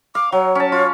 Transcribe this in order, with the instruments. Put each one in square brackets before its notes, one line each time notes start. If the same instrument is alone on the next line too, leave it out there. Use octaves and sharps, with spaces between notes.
[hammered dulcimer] F5 [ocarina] D6
[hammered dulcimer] F#3 [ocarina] C#5
[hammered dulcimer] C#4 A5
[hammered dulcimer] F4 [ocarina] C#5